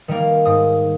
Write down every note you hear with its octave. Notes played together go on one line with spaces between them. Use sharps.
D#3 G3 A#3
G#2 D#6